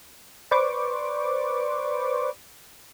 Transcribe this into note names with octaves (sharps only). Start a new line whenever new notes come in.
B4 C5 D5 C#6 D6